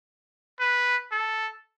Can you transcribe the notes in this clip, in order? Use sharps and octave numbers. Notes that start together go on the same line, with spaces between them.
B4
A4